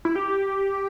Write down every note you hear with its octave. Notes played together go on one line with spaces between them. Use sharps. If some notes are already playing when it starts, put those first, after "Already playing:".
E4
G4